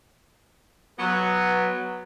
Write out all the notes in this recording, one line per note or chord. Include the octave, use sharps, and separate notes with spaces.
F#3 B3